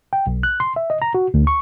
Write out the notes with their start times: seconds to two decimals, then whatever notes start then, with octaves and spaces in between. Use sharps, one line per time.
0.13 G5
0.27 B1
0.43 F#6
0.60 C6
0.76 E5
0.90 D#5
1.02 A#5
1.15 F#4
1.34 D2
1.47 C#6